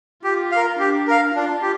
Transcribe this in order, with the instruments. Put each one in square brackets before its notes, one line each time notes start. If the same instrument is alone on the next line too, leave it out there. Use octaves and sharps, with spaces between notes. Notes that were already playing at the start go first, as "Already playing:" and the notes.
[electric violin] F4 [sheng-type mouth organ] G4
[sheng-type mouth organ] A#4 F5
[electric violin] D4 [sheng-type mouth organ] G4
[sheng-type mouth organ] A#4 F5
[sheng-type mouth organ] D4 [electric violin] F4
[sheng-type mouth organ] G4